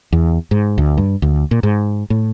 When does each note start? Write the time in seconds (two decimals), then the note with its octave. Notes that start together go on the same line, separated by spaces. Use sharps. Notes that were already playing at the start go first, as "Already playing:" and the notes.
0.12 E2
0.51 G#2
0.78 D2
0.98 G2
1.22 D2
1.51 A#2
1.63 G#2
2.10 A2